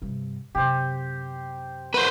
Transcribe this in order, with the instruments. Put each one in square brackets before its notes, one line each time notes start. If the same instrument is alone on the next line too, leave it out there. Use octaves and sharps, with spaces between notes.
[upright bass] G2 C3
[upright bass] F#2 C3 [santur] G4 C5
[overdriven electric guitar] B4 C5 [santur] F#5